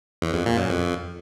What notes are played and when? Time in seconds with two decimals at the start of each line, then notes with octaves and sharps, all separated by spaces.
0.22 E2
0.34 F2
0.46 A#2
0.57 F#2
0.69 F2